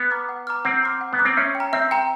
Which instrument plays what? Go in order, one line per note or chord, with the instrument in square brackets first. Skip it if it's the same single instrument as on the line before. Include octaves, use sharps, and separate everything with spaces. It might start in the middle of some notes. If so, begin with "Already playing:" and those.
Already playing: [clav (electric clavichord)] B3
[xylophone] A#5 D6 F6
F#5
A#5 D6 F6
[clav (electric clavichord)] C4 [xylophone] F#5
[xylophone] A#5 D6 F6
F#5
[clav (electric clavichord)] B3
[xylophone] A#5 D6 F6
[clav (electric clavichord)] C4
[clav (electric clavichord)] C#4 [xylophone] E5
[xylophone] G5
A#5
[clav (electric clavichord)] C4 [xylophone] E5
[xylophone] G5 A#5